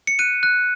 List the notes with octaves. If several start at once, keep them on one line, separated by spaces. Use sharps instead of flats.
C#7
F#6 D#7
F#6